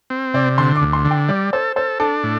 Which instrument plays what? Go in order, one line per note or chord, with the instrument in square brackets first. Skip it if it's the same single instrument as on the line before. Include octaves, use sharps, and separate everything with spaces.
[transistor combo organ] C4
[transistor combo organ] C3 [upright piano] D5
[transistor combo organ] D3 [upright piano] C6
[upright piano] D6
[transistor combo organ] D2
[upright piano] C6
[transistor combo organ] D3
[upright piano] G5
[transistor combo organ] G3 [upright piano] D5
[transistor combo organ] A4 [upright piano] C5
[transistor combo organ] A4 [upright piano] C5
[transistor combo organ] D4 [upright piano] A4
[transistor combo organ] A2